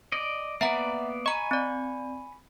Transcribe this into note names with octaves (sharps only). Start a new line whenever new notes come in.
D5 D#5
A#3 B3 D5 E5 F#5 A#5
D#5 G#5 A#5 B5 C#6
C4 D5